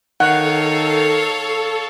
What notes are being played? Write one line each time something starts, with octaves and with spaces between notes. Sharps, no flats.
D#3 A4 C#5 F5 F#5